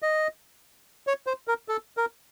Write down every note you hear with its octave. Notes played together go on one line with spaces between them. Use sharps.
D#5
C#5
C5
A#4
A4
A#4